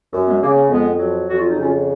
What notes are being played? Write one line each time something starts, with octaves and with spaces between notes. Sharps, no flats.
F#2
G#3 B3
C#3 A#3
A#3
F2 G#3 B3
F#3
F2 F#4
F4
D#4
C#3 C#4 F4